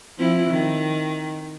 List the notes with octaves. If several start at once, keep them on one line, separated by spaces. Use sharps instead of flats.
F3 C4 E4
D#3